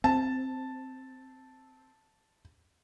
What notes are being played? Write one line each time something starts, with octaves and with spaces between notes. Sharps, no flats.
C4 A5